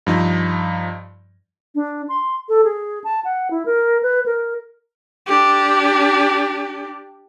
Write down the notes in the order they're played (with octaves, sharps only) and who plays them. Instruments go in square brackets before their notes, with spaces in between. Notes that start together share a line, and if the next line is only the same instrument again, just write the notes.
[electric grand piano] G2 F3 D#4
[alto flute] D4
C6
A4
G#4
A5
F#5
E4
A#4
B4
A#4
[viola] D4 G4